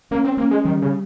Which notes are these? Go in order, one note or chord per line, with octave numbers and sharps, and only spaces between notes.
A#3 C#4
C4
A#3 C#4
G#3
D#3 G3
C#3